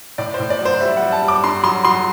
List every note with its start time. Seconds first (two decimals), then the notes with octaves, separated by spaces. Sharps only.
0.18 A2 D5
0.34 C5
0.40 A2
0.50 D5
0.60 F#3
0.65 C5
0.81 G3 E5
0.97 G3 F#5
1.12 A5
1.22 G3
1.28 D6
1.44 G2 C6
1.63 F#3 C6
1.85 F#3 C6